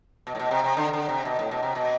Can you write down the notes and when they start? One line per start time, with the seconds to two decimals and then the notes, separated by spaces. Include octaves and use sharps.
0.27 B2
0.35 A2
0.39 B2
0.51 C3
0.64 C3
0.77 D3
0.93 D3
1.09 C3
1.25 B2
1.39 A2
1.51 B2
1.63 C3
1.75 B2